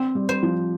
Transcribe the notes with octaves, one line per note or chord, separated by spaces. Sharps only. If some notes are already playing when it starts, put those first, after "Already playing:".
Already playing: C4
G3
C5
F3